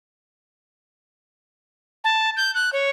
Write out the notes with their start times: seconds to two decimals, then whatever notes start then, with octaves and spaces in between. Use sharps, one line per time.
2.04 A5
2.37 G6
2.55 F#6
2.73 C#5